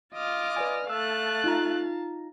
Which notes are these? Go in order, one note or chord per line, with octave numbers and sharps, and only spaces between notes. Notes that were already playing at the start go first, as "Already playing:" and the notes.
F4 D#5 D6 F6
B4 D5 G#5
A3 F5 A5 E6 F#6
D#4 F4 A#5